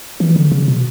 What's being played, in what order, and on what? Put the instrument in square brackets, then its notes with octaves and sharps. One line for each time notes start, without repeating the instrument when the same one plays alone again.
[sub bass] E3
D3
C#3
B2